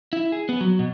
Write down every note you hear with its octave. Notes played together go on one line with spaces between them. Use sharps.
E4
G#4
B3
F#3
B2